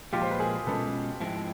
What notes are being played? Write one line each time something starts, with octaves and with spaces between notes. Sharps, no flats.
A#2 F3 G#3 F4 G4
C5
B4
G#4 A#4
B2 G#3 C#4 F4 A4 B4
G#2 F3 G#3 C4 E4